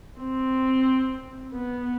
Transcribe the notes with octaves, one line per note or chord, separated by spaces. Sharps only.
C4
B3